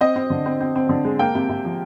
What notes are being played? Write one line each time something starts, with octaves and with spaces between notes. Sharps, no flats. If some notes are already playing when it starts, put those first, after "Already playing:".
C4 D#5
C4
D3
C4
C4
C4
D3
G#3
A#3 G5
C3
C3
F3